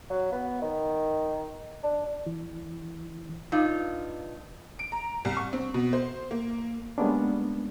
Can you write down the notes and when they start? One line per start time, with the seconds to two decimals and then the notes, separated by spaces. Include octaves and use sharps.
0.10 F#3
0.32 B3
0.62 D#3
1.83 D4
2.26 E3
3.52 G2 D#4 F4
4.79 D7
4.92 A#5
5.25 C2
5.37 C#6
5.53 C4
5.74 B2
5.93 C5
6.31 A#3
6.98 G3 G#3 A#3 B3 C#4 D4